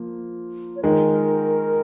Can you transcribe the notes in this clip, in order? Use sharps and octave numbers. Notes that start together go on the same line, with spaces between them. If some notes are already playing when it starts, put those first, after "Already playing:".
Already playing: F3 A#3
C#5
D#3 G#3 A#4